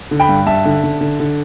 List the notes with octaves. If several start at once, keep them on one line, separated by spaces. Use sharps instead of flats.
D3
G5 B5
G2
G2 E5 A5
D3
D3
D3
D3